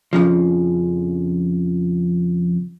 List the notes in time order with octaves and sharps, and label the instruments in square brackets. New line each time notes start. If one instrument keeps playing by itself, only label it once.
[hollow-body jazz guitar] F2 C#3 F3